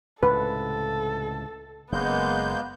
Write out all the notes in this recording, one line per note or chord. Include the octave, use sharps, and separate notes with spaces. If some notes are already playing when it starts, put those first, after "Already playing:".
C#2 A2 C3 A4 B4
F#1 C#3 G#3 A#3 B3 G6